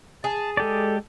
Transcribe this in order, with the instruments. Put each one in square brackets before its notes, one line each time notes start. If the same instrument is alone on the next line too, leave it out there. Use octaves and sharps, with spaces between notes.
[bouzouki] G#4 [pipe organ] A5
[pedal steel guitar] G#3 G4 D5 [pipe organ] A4